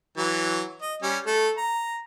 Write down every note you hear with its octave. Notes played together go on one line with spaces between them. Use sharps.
E3 F#3
D#5
G3 C#4
A3 A4
A#5